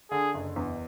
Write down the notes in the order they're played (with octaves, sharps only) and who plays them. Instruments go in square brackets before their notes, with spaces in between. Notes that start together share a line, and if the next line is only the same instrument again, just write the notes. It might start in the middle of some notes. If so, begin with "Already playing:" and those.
[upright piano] D3 [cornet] G#4
[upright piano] F#1
E2